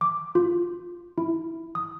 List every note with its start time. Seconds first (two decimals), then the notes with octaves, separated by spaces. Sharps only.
0.01 D6
0.35 F4
1.18 E4
1.75 D#6